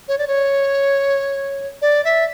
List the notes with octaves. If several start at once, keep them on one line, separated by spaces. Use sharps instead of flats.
C#5
D5
C#5
D5
E5